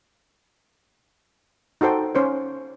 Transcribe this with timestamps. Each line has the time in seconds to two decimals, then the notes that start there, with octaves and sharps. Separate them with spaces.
1.81 D#4 F#4 A4 C5 G5
2.15 C#4 C5 C#5